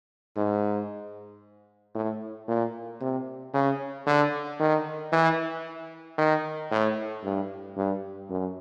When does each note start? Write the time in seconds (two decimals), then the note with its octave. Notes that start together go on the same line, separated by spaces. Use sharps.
0.36 G#2
1.95 A2
2.48 A#2
3.01 C3
3.54 C#3
4.07 D3
4.59 D#3
5.13 E3
6.18 D#3
6.71 A2
7.24 G2
7.77 G2
8.30 F#2